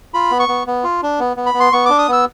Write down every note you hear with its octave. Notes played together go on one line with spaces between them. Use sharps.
F4 B5
B3
C#6
B3
B3
F4
D4
B3
B3
B5
B3
C6
B3 C#6
D4 D6
D#6
B3 E6